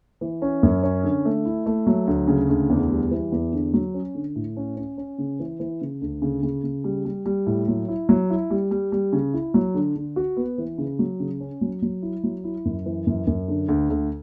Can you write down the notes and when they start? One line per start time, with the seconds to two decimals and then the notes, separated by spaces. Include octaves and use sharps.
0.21 E3
0.42 C#4
0.63 F#2
0.83 C#4
1.03 D3
1.25 A3
1.45 E4
1.66 A3
1.87 F#3
2.07 D2
2.28 C#3
2.49 D2
2.70 E2
2.91 G3
3.11 E3
3.32 E2
3.53 D3
3.74 F#3
3.94 C#4
4.15 D3
4.36 A2
4.57 C#4
4.77 C#4
4.98 C#4
5.18 C#3
5.39 E3
5.60 E3
5.81 C#3
6.01 D2
6.22 C#3
6.43 C#3
6.64 C#3
6.84 G3
7.05 G3
7.26 G3
7.46 A2
7.68 F#3
7.88 E4
8.09 F#3
8.30 E4
8.50 G3
8.71 G3
8.92 G3
9.13 C#3
9.34 E4
9.54 F#3
9.74 D3
9.96 D3
10.16 F#4
10.37 B3
10.58 E3
10.78 C#3
10.99 F#3
11.20 C#3
11.40 C#4
11.61 F#3
11.82 F#3
12.02 E4
12.24 F#3
12.44 E4
12.65 F#2
12.86 E3
13.07 F#2
13.27 F#2
13.48 D3
13.68 D2
13.90 D2